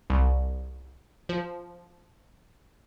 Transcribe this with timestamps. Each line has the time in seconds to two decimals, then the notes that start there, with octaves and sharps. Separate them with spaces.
0.10 C2
1.29 F3